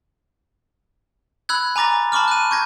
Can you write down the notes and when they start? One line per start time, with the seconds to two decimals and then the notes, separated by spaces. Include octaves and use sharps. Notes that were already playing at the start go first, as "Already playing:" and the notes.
1.49 B5 E6 F#6 G#6
1.76 G#5 A#5 D6 A6 A#6
2.12 A5 B5 C#6 D6 F6
2.28 F#6 D#7
2.51 C#6 G6 G#6 A#6